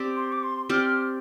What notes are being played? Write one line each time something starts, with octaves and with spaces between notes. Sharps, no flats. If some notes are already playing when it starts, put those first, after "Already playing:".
Already playing: C4 G4 D5
C6
D6
C6
C4 G4 D5 F6